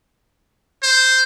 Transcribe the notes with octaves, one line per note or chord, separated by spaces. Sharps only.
C5